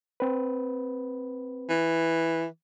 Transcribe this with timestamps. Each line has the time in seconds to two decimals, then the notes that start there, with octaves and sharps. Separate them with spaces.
0.20 C4 B4
1.69 E3